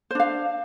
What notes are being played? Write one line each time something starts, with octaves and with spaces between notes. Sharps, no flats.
D4 C5 F5